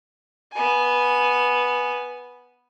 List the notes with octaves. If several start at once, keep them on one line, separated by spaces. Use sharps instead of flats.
B3 G#5